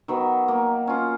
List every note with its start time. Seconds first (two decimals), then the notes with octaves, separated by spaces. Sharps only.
0.08 D#3 F#3 B3
0.48 A#3
0.87 C#4 F4